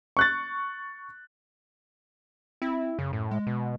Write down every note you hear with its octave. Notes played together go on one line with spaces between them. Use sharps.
C#6 F#6 A6
C4 E4
F#2 C#3
A2
G#3
B2